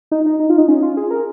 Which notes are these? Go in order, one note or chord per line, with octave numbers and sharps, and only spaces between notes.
D#4
D#4
D#4
F4
D#4
C#4
F4
G#4
A#4